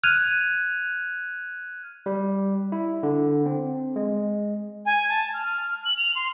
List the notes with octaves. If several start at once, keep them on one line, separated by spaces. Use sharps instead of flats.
F6 F#6 G#6 D#7 F7
G3
E4
D3
C4
G#3
G#5
A5
F6
F#7
F7
C6